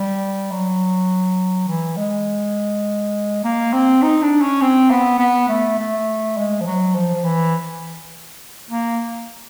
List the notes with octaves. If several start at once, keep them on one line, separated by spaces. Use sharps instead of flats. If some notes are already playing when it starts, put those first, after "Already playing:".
Already playing: G3
F#3
E3
G#3
A#3
C4
D#4
D4
C#4
C4
B3
B3
A3
A3
G#3
F3
F#3
F3
F3
E3
A#3